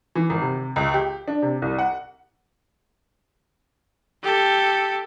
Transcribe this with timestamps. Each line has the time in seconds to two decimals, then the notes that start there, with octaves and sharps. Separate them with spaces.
0.15 E3
0.30 G#1
0.41 C3
0.76 C#2
0.94 G4
1.28 D4
1.42 C3
1.62 C2
1.78 F#5
4.23 G4 A4